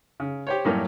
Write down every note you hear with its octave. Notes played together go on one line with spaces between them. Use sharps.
C#3
G4 C5 C#5
F#2 A2 G3 A#3 C#4